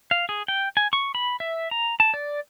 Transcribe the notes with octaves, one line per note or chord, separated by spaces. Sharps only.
F5
G#4
G5
G#5
C#6
B5
E5
A#5
A5
D5